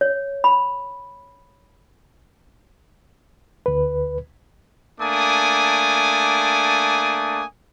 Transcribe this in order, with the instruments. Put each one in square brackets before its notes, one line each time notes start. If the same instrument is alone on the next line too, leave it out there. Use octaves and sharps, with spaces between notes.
[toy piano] C#5
B5
[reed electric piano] D2 B4
[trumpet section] A3 A#3 D4 G#5 D6 D#6